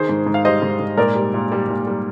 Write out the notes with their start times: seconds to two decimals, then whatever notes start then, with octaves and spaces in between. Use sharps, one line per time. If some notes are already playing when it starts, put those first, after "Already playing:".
Already playing: D#3 G#4 C5
0.09 G#2
0.27 G#2
0.34 F5
0.45 G3 C5 D#5
0.62 G#2
0.79 G#2
0.97 A#2 A#4 D5
1.16 G3
1.34 A#2
1.52 G3
1.69 A#2
1.87 G3